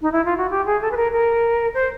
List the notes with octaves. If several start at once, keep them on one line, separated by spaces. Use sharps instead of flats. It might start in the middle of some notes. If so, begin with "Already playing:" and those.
D#4
E4
F4
F#4
G4
G#4
A4
B4
A#4
A#4
C5